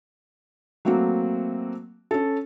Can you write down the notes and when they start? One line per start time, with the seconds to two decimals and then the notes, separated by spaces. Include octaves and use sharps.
0.85 F#3 A3 A#3 C4 F#4
2.11 C#4 A4